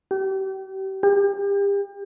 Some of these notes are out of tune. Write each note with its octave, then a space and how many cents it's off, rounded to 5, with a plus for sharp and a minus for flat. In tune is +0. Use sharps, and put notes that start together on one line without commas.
G4 -35
G4 +35